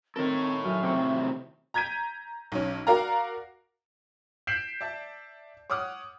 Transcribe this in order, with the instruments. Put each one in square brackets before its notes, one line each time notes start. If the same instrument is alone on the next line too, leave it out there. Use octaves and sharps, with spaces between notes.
[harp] D#3 A#4 [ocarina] C4 [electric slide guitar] A4 C#5
[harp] F#2 G#5 F6 [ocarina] E5
[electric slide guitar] A2 C3 [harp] G5 C#6
[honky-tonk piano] A#5 G6 G#6 B6 D#7
B1 C#4
F#4 A#4 D5 F5 A#5
G6 B6 C7 D7 E7 F#7
D5 E5 A5
C#5 F#5 D6 D#6 F6